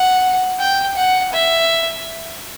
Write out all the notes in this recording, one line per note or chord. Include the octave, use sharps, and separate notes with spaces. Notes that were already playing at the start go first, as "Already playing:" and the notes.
Already playing: F#5
G5
F#5
E5